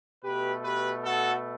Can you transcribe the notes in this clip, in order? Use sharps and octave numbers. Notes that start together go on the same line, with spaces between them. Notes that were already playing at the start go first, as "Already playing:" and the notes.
B2 A3 G4 B4
G4 B4
F#4 A4